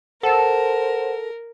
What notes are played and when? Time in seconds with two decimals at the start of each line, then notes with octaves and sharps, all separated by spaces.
0.23 A4 A#4 C5 F#5 A5 E7